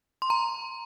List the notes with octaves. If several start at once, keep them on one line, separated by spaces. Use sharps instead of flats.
C6
A#5